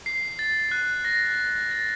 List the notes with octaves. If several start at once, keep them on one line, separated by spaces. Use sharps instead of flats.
C7
A6
F#6
A#6
A6